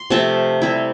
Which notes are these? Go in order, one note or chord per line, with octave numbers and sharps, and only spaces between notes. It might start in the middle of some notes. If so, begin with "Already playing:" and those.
Already playing: C6
C3 F3 A3 C4 A5
G3 C4 E4